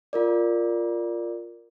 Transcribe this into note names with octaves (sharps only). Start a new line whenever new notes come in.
F4 A#4 D5